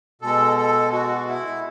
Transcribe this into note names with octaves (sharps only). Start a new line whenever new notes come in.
B2 G#3 A4
A4
F#4
E4